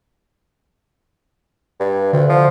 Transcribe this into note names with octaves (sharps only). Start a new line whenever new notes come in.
G2
D2 D3
F3